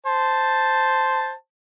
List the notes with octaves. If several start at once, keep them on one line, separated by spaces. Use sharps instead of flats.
C5 A5